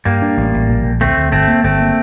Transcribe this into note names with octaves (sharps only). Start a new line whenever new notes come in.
G2 G3 A#3
D4
A1
A1
A#1
A#1
D2 A3 C4
D2
G1 A3 C4
A#3
G1 A3 C4
A#3